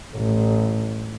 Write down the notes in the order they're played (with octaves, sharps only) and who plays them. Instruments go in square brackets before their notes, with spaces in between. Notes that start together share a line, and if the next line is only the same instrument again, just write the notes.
[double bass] A1